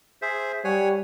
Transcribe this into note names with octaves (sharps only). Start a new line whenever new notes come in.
G#4 C5 E5
G3 C#5 F#5 G#5